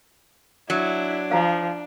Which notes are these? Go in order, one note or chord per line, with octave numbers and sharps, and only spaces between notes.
F#3 D4 E4
F3 F5 A#5